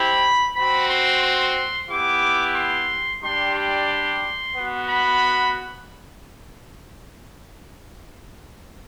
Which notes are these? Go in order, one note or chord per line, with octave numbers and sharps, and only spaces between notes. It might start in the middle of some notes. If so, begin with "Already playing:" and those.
Already playing: C4 E4 G4 B5
C4 F#4 B5
C6
C6
B3 E4 G4 D6
C6
G3 D4 G4 C6
C6
B3 F#4
B5